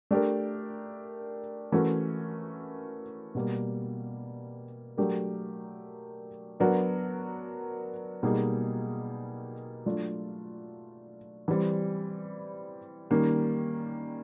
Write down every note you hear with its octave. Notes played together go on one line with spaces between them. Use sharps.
A3 D4 G4 A#4
E3 A3 C#4 F#4 A#4
B2 G3 A#3
F#3 A3 D4 G4 A#4
F#3 B3 D4 F#4 A#4
B2 G3 A#3 D#4 G#4
F#3 A3 D4 F4
E3 G3 C4
D#3 G3 A#3 C#4